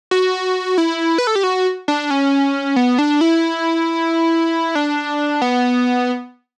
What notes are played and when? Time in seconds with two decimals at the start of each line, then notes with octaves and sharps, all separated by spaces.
0.11 F#4
0.78 E4
1.18 B4
1.27 A4
1.35 G4
1.43 F#4
1.88 D4
2.10 C#4
2.76 B3
2.98 D4
3.21 E4
4.75 D4
5.42 B3